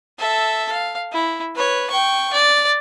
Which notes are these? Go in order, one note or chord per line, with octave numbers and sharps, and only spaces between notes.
A4 E5
F5
E4
B4 C#5
G5 C#6
D5